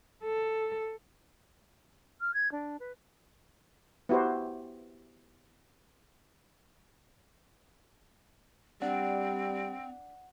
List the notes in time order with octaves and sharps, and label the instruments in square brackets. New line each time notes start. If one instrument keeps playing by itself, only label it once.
[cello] A4
[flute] F6
G#6
D4
B4
[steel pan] B3 E4 F#4 G4 C5
[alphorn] G3 [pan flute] C4 [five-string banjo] D4 [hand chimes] F#5